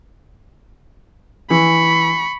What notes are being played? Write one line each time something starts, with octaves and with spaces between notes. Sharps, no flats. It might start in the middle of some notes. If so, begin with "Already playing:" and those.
E3 B5 C#6